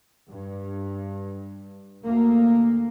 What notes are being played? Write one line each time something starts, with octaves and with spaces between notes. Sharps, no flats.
G2
D2 A#3